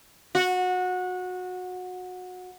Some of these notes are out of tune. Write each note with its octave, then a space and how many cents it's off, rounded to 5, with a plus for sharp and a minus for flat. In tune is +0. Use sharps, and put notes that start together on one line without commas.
F#4 -20